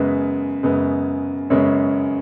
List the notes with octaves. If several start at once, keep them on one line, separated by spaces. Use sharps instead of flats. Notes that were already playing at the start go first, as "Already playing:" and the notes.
Already playing: F#2 C#3 G#3 B3 B4
F#2 C#3 G#3 B3
F#2 C#3 G#3 B3 C#5